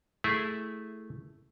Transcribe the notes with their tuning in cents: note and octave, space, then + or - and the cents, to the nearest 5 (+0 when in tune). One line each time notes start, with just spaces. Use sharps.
A3 +0 E4 -5 G#4 +0